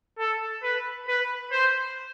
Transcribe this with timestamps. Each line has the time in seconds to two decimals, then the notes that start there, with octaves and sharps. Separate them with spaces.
0.19 A4
0.63 B4
1.08 B4
1.52 C5